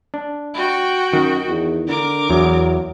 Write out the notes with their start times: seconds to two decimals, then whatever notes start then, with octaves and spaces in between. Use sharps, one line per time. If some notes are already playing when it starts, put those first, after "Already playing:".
0.14 D4
0.54 F#4 G5
1.13 F#2 D#3
1.49 E2
1.88 D3 A#4 D6
2.30 E2 F#3